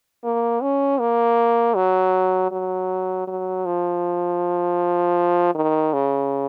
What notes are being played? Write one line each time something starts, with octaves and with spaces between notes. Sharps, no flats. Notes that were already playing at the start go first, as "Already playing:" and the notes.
A#3
C#4
A#3
F#3
F#3
F#3
F3
D#3
C#3